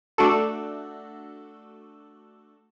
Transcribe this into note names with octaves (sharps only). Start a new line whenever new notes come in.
A3 D4 F#4 A4